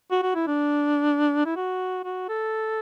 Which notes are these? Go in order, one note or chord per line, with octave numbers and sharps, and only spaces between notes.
F#4
F#4
E4
D4
E4
F#4
F#4
A4